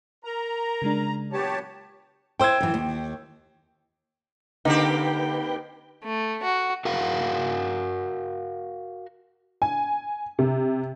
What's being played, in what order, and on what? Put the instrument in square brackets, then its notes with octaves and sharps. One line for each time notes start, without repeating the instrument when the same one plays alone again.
[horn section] A#4 [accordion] A#5
[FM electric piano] C#3 G#3 D4
[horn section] A#2 F#3 B3 [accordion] G4 C#5 A5
[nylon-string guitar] E4 C5 [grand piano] G5 E6 G#6
[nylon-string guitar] F#2 E3
D#2
[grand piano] D3 [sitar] A#3 C4 G4 [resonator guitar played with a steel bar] D#4 [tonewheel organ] B4 G5
[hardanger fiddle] A3
F#4
[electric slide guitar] F#4 A#4 F5 F#5
[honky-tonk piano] G#5
C3